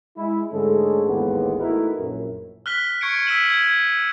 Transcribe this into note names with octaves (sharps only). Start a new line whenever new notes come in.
G#3 E4
G#2 D3 G#3 A3 C#4 A4
A1 D#2 G#3 A#3 B3
A3 D#4 E4 F#4 A#4 B4
A#1 F#2
F6 F#6 B6 G7
C#6 G#6 C#7 D7
E6 B6 D#7 E7 F#7
G#6